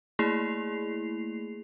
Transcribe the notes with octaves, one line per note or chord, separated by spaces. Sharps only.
A3 A#3 E4 G#4 C7 F7